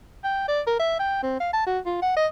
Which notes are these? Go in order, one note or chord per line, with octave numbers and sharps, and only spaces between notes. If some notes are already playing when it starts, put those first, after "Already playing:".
G5
D5
A#4
E5
G5
C4
F5
A5
F#4
F4
F#5
D#5